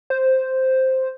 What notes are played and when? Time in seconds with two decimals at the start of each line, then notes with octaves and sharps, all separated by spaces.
0.10 C5